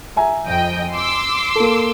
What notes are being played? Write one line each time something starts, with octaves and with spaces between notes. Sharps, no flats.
E5 G#5 A#5
F2 D#5 G5
C6 D6 E6
A#3 A4